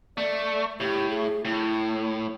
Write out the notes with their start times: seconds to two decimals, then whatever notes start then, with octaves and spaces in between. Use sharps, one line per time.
0.18 A3 D5
0.80 A2 G4
1.10 G#4
1.45 A2 E4